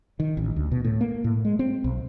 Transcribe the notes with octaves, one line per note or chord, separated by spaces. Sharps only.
D#3
A1
D2
B2
A2
A#3
A2
G#3
C4
B1